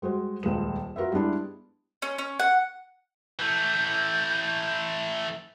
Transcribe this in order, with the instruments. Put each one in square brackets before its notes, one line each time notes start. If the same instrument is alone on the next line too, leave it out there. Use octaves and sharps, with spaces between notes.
[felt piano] G3 G#3 F#4 C5
D#1 C#2 F3 G#3 E7
F4 F#4 A#4 B4 E5
G3 G#3 B3 D4 E4
[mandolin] C#4
C#4
F#5
[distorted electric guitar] E3 A3 [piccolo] G6